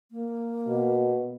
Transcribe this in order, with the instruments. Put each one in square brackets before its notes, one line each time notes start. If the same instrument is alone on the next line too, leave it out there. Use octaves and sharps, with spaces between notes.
[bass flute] A#3
[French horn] B2